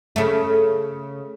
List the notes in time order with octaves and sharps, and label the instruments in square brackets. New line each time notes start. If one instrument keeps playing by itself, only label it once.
[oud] C#3 A3